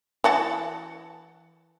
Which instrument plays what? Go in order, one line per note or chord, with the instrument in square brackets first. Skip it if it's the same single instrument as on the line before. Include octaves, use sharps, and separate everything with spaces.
[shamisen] E3 F#4 A5